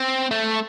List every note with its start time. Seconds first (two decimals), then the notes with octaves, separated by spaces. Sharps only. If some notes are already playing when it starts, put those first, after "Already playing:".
Already playing: C4
0.31 A3